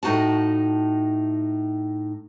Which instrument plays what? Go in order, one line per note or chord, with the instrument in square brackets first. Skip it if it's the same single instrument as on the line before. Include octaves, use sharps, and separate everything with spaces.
[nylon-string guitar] A2 D#4 F#4 A5